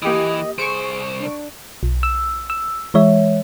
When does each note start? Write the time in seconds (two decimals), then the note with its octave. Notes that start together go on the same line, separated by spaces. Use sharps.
0.02 E3 A#3 G4 D#5 D#6
0.58 C2 G#4 C5 C#6 D7
1.20 D4
1.83 B1
2.03 E6
2.50 E6
2.94 E3 G#3 C#5 E5